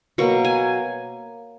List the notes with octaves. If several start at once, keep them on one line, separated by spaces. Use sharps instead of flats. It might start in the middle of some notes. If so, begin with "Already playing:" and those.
B2 F#3 A#3 C#6
G#5